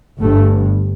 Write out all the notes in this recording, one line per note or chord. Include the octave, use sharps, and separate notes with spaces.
G1 G2 A3